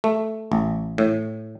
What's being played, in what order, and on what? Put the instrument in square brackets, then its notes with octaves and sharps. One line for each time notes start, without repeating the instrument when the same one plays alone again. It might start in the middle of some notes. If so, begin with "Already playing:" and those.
[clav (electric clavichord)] A3
A1
A2